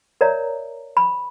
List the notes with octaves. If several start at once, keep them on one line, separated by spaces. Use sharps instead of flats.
A#4 C#5 D5 E5 A#5
B5